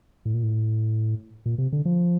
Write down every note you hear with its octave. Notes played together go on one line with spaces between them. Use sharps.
A2
A#2
A2
A#2
C3
D3
F3